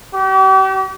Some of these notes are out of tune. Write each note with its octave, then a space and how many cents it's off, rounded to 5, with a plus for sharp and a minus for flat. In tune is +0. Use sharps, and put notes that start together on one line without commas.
G4 -40